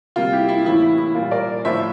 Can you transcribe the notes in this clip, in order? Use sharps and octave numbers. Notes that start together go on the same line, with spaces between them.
C3 G3 A#3 F4
E4 G4
E4
A2 E3 A#3 E4
E4
E4
A#2 G3 A#3 F4
A#4 D5
A2 F3 A#3 C5 E5